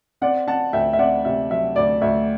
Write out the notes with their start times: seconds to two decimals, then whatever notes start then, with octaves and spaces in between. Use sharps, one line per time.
0.21 C4 D5 F#5
0.47 C4 F#5 A5
0.73 D2 E5 G5
0.93 E5
0.99 C4 D5 F#5
1.25 C3 E5
1.50 F#3 E5
1.76 D2 D5
2.02 D2 E5